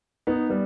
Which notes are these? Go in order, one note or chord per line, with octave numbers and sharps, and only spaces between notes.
B3 D#4
G3 B3